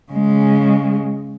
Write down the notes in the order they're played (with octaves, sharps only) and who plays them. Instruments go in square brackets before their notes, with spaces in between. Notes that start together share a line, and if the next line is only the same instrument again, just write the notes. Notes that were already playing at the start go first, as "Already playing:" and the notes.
[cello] C#3 G#3